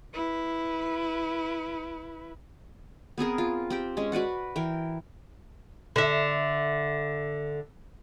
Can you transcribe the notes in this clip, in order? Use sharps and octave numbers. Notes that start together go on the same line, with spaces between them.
E4 B4
B3 C4 G#4 A#4
F4
C4 G4 G5
G#3 C#4
F#4 B4 D5 F#5
E3 A#4 G5
D3 E5